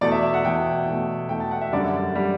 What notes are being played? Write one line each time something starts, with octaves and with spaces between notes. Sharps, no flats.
E2 B2 A3 D5
E5
E5
F#5
E2 B2 A3 G5
E2 B2 A3
E2 B2 A3 G5
A5
F#5
E5
F#2 D3 G3 D5
D3 G3